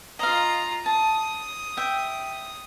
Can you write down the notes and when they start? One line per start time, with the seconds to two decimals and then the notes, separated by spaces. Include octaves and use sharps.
0.19 F4 D#5 F5 A#5
0.86 A5 D#6
1.77 E5 G5